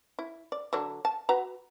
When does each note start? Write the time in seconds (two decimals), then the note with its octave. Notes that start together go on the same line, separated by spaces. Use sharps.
0.19 E4
0.52 D5
0.73 D3 F#3 D4
1.05 A5
1.29 F#4 B4 A#5